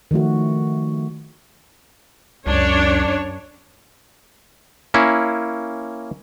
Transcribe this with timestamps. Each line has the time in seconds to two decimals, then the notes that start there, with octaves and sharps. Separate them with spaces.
0.11 D#3 F3 A3 F#4
2.47 C#2 F#2 D4 C#5
4.94 A#3 C#4 E4